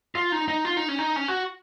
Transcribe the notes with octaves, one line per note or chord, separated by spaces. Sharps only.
F4
D#4
D#4
F4
D#4
C#4
D#4
C#4
F#4